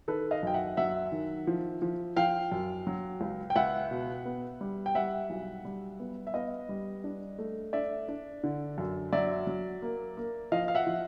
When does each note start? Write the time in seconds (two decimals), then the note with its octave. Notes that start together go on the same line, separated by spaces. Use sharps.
0.08 D#3 A4 B4
0.31 D#5 F5
0.43 F#2 G5
0.54 E5 F#5
0.77 F#3 E5 F#5
1.12 D#3
1.47 F3
1.82 F3
2.16 F3 F5 G5
2.52 F#2
2.87 F#3
3.21 C#2
3.50 G5
3.56 C#2 E5 F#5
3.91 B2
4.25 B3
4.61 G3
4.86 G5
4.95 G3 E5 F#5
5.30 B1
5.65 G3
6.00 B3
6.27 E5
6.34 B3 D#5 F5
6.69 G3
7.04 D4
7.39 A3
7.73 D4 D5 E5
8.08 D4
8.44 D3
8.78 F#2
9.13 F#3 D5 E5
9.47 F#3
9.82 A#3
10.17 A#3
10.52 F3 D#5 F5
10.68 F5
10.75 E5 F#5
10.87 F3